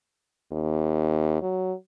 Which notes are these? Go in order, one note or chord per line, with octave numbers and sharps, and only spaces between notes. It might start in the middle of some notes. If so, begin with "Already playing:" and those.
D#2
F#3